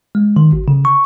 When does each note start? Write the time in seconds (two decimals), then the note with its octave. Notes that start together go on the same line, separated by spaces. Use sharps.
0.15 G#3
0.36 D#3
0.53 G#1
0.68 C#3
0.85 C#6